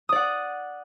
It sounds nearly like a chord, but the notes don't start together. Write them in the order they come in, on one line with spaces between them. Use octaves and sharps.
D#6 D5 F#5